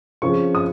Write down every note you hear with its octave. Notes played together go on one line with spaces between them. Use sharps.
C#3 F3 C4 C#6
D#6